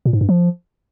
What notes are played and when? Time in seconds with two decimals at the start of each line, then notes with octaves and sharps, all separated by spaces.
0.06 A#2
0.13 G#2
0.21 G2
0.29 F3